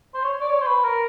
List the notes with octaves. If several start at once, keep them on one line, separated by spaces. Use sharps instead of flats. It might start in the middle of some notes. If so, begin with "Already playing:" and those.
C5
C#5
D5
C#5
C5
B4
A#4